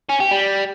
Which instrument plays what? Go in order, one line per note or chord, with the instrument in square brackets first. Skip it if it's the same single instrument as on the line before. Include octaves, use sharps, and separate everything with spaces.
[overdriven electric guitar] C#4
G4
G3